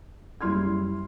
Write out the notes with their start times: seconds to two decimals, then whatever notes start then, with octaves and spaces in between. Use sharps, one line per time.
0.41 F#1 G3 E4 C6 F6 G#6